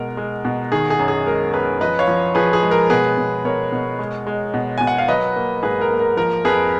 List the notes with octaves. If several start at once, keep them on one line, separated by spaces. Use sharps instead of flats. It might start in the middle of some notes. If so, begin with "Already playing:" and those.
Already playing: B2 G#3 A#4
G#3
B2
D#3 G#4
G#4
F#2
G#4
G#3 A#4
F#2 G#4 B4
F3 B4 D#5
C#5 F5
F3
F3 G#4 B4
G#4
G#3
A#4
B2 G#4 B4
B2
B2 A#4 C#5
B2
G#3
G#3
B2
B2 G#5
F#5
F5
F#3 B4 D#5
A#3
G#2 G#4 B4
A#4
A#3
A#4
F3 A#4
F2 G#4 B4